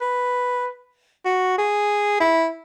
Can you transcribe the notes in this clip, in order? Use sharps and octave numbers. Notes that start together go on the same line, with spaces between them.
B4
F#4
G#4
E4